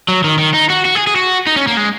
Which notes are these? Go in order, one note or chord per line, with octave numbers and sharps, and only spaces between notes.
F#3
D#3
D#3
D#4
F#4
F#4
G#4
G#4
F#4
D#4
C#4
A#3
G#3